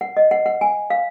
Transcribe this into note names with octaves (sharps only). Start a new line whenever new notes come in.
F#5
D#5
F#5
F#5
G#5
F5